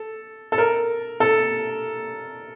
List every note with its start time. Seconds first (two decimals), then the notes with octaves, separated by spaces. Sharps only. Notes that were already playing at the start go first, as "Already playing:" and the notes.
Already playing: A4
0.52 A4
0.58 A#4
1.20 A4